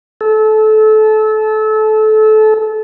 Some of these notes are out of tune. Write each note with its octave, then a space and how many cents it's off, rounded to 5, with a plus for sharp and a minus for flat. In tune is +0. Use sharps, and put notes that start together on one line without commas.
A4 -25